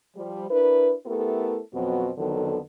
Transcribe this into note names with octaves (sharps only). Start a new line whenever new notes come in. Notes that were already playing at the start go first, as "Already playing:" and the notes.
F3 G3
D4 E4 A#4 B4
A3 B3 E4 G4 A4 A#4
F2 B2 F#3 B3 C4 F#4
F2 D3 D#3 F#3 B3 A4